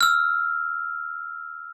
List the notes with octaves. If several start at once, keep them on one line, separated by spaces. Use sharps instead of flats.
E6 F6